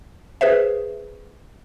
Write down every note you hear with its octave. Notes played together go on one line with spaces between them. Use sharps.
G#4 B4 C5 E5